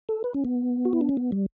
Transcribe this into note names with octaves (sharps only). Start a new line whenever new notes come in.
A4
B4
C#4
B3
F#4
E4
D4
C#4
B3
G3